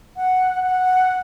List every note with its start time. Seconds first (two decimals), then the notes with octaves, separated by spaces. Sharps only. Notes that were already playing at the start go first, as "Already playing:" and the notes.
0.16 F#5
0.63 F#5